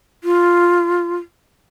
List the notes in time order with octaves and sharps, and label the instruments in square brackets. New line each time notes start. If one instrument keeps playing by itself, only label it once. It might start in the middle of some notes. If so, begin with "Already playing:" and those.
[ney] F4